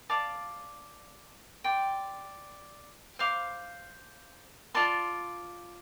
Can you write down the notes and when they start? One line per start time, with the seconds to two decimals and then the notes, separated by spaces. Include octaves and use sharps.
0.10 D5 F5 A5 D6
1.64 D5 G5 C6
3.19 C5 F5 D6
4.74 F4 D5 A5 C6